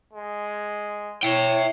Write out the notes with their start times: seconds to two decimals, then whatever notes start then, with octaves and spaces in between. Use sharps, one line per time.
0.13 G#3
1.23 E4 C#5 E5 G5